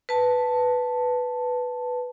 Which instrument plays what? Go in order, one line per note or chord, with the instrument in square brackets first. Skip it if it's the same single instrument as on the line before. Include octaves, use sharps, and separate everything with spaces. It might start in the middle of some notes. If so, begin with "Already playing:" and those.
[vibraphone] B4 A5